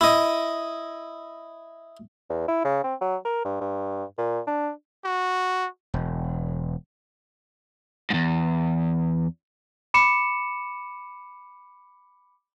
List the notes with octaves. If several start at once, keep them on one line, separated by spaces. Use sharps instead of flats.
E4 D#5
E2
E4
C#3
C4
F#3
A#4
G2
G2
A#2
D4
F#4
E1
E2 G#2
B5 D6 C#7 E7